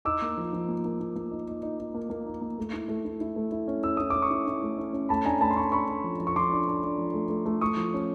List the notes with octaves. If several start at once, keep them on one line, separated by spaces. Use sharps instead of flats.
D#4 D6 E6
A#3
F3
F3
A#3
A#3
A#3
A#3
D#4
D#4
D#4
D#4
A#3
A#3
D#4
A#3
A3
E4
A3
E4
E4
A3
E4
C#4
E4 E6
E4 D#6
C#4 D6
C#6 D#6
E4
E4
A3
C#4
C#4
A3 A5 B5
D4 G#5 A#5
A3 A5 B5
C6
D4 B5 C#6
D4 B5 C#6
D4
F3
F3
C#6
F3 C6 D6
D4
D4
D4
F3
A3
A3
A3
A3 C#6 D#6
F3
C#4